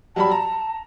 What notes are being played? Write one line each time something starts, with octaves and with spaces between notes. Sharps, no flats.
F#3 G3 A5 B5
A#5